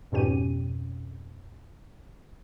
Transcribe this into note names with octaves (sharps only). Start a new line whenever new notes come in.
F2 G#2 B2 C#4 G4 D#7